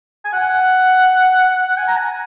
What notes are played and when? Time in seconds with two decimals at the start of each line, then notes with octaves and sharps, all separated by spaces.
0.25 G#5
0.33 F#5
1.77 G#5
1.88 A#5
1.96 G#5